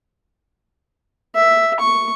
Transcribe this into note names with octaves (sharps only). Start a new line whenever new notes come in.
E5
C#6